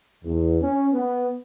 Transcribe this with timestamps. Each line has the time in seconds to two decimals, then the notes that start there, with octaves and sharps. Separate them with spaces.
0.24 E2
0.61 C#4
0.92 B3